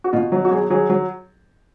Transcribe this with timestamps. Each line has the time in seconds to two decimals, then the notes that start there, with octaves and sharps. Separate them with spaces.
0.04 F#4
0.13 B2 F4
0.32 F#3
0.45 F#4
0.51 F#3 G#4
0.70 F#3 G#4
0.89 F#3